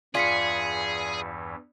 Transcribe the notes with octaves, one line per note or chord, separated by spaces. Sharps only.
E2 G2 E3 F4 G#4 D5 B6 C#7